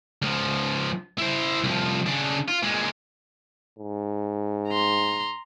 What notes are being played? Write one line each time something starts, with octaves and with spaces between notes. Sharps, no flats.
C#2 F3
E4 C5
C2 F3
C#3 D4
F4
A#2 G#3
G#2
A#5 C6